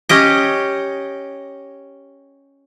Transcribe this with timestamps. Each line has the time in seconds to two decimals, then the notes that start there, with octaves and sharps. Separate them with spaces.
0.09 C#4 G4 D#5